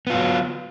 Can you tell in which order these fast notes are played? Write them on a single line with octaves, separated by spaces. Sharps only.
B3 F4 F#3